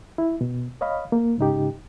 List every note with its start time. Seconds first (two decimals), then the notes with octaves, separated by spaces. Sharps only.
0.18 E4
0.41 B2
0.81 C#5 D#5 F5 B5
1.12 A#3
1.38 G#2 C#3 D#4 G4